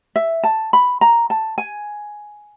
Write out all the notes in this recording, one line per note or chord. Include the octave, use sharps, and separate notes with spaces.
E5
A5
B5
A#5
A5
G#5